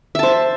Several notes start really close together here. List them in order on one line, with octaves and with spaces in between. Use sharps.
E5 A5 C5